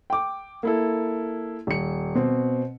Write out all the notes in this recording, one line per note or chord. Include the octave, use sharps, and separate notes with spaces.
G5 D6
A#3 E4 A4
D#1 C#7
B2 C4